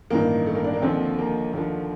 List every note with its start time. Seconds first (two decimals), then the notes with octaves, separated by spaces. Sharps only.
0.10 A1 G2 D#3 A#3
0.46 A3
0.55 A#3
0.64 D4
0.73 A#3
0.82 D#2 D3 F3 C4
1.19 A#3
1.53 D#2 D3 F3